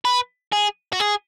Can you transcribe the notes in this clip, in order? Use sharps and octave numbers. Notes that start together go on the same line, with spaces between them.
B4
G#4
F#4
G#4